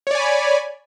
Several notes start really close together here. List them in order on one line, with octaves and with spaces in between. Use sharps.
C#5 D5 G#5 B5